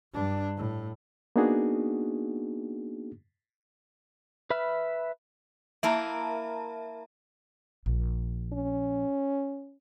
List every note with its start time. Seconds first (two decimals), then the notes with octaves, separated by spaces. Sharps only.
0.13 G2 D4
0.57 A2
1.36 A#3 B3 D4 D#4 F#4 G#4
4.50 B4 E5 B5 F6
5.83 A#3 E4 A#4 E5 A5 A#5
7.86 A#1
8.53 C#4